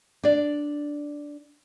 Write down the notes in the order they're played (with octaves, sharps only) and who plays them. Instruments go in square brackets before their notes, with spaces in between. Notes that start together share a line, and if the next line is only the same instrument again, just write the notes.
[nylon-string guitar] D4 D5